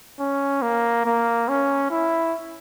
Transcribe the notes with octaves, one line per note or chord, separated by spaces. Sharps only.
C#4
A#3
A#3
C#4
E4